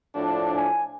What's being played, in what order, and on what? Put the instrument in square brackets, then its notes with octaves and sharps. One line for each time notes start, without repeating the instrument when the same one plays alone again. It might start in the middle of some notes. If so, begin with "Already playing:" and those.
[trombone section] A2 F3 D4
[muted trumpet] G#5